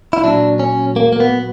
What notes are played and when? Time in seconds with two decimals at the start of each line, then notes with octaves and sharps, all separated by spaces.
0.13 E4
0.24 A#2 F#3 D4
0.59 C#4
0.96 A#3
1.13 A#3
1.20 B3